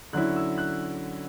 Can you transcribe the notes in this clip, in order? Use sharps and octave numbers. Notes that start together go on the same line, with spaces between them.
D3 F#3 C#4 E4 F#6
E6
F#6